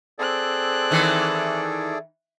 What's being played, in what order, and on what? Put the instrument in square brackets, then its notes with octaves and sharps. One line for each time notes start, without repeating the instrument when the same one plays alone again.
[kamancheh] C4 F#6 [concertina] G#4 A4 D5
[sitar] D#3 E3